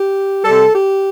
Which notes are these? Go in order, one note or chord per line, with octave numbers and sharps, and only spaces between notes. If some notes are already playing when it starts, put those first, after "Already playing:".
Already playing: G4
C3 G3 A4
G4